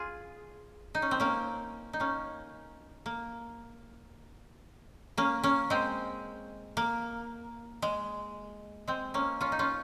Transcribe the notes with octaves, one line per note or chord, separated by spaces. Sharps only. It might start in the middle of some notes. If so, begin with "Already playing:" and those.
Already playing: F4 G#4
D#4
C#4
C4
A#3 C#4
D#4
A#3 C#4
A#3
A#3 C#4
A#3 C#4
G#3 C4
A#3
G#3
G#3 C4
A#3 C#4
C#4 F4
D#4
C#4 F4